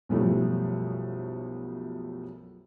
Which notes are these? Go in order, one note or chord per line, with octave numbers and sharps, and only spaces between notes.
B1 F#2 F3 G3 A3